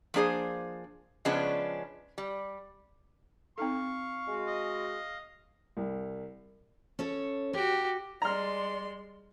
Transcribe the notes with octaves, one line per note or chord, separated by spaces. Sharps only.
F3 A#3 D4 G#4 C5
C#3 F3 G#3 B3 C#4 D4
G3
C4 D#4 A4 F5 C#6
G#3 F#4
D#5
C2
C#4 A4 C#5
F#4 G4 A#4
G3 G#3 D5 A#5 C6 F6